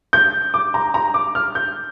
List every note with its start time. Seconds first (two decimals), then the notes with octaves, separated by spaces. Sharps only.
0.13 G6
0.54 D6
0.74 A#5
0.94 A#5
1.14 D6
1.35 F6
1.55 G6